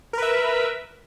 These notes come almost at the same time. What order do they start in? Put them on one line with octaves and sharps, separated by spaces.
A#4 B4 E5